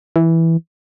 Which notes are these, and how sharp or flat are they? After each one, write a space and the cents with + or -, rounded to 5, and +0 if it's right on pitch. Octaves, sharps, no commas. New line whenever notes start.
E3 -5